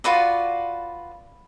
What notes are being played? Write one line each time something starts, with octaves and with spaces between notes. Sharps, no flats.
F4 F#4 B4 D5